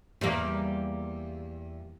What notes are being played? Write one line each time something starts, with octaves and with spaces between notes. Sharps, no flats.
E2 G3 A#3